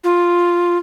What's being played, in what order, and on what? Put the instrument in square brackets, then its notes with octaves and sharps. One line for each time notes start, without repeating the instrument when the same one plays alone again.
[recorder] F4